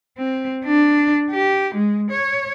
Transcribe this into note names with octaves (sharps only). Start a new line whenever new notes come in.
C4
D4
G4
G#3
C#5